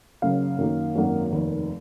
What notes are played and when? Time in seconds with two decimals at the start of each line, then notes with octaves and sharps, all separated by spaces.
0.22 F#1 F#2 C#3 F5
0.58 F#2 D#3 A#3
0.95 G#1 F#2 D#3 F#3 A#3
1.32 F1 D#2 D#3